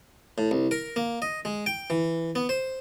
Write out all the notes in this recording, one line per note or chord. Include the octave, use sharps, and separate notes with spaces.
A2
C2
A#4
A#3
D#5
G#3
G5
E3
B3
C5